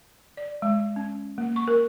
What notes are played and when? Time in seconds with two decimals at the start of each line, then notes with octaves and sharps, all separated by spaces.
0.37 D5
0.62 G#3
0.96 C#4
1.38 A#3
1.56 C#6
1.68 A#4